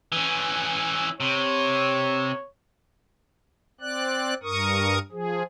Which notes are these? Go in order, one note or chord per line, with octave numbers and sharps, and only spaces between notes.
E3 C#4
C3 C#5
C4 D5 F#6
G2 A#4 C#6 D#6
F3 G#4